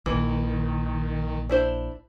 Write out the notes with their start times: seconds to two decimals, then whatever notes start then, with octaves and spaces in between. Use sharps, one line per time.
0.06 A#1 A#2 D#3 E3
1.49 D4 E4 C5